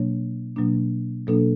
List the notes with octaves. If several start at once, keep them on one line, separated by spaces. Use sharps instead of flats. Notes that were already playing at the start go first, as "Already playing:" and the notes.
Already playing: B2 F#3 A#3 D4 C#5
B2 F#3 A#3 D4
B2 F#3 A#3 D4 A4